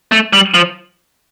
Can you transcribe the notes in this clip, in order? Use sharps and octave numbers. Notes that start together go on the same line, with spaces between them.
A3
G3
F3